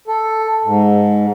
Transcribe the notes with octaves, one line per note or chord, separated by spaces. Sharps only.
A4
G#2